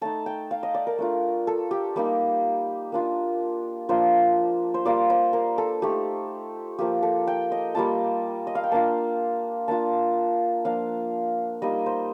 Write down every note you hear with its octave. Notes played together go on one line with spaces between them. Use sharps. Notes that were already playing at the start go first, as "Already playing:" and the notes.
A3 D#4 A5
G5
F5
D#5
D5
A#4
A3 D4 F4
A4
G4
G3 A#3 D#4 G4
A#3 D4 F4
F3 A#3 D4 F4 C5
C5
G3 A#3 F4 D5
C5
A#4
A4
A3 D#4 G4
F3 A#3 F4 G4
A4
G5
D#5
G3 A#3 F4 A5
D#5
F5
G5
A#3 D4 F4 A5
A#3 D4 F4 A5
F3 A#3 D4 F5
G3 A#3 D#4 D#5
C5